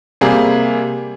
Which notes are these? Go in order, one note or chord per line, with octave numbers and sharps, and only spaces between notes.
C3 G3 A#3 G#4